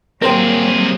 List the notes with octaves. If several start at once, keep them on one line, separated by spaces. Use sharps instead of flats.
F#3 G3 A#3 C4 G#4 A#4 C5 G5